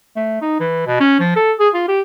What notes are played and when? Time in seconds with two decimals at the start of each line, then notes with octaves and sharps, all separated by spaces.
0.16 A3
0.41 D#4
0.60 E3
0.87 B2
1.00 C#4
1.20 F3
1.36 A4
1.60 G#4
1.74 F4
1.88 G4